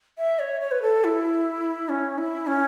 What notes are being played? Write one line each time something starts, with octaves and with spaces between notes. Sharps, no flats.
E5
C#5
C#5
B4
A4
E4
C#4
E4
C#4